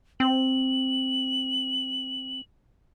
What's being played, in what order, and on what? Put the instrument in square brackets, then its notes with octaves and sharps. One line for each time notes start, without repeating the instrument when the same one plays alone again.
[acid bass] C4 [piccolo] F#7